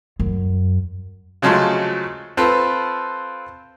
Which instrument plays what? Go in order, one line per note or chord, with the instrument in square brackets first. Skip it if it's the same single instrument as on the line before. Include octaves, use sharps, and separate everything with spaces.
[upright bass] F#2
[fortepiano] C#3 F3 F#3 G#3 A3
C4 F4 A4 B4